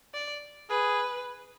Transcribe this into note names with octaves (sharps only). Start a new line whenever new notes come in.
D5
G#4 B4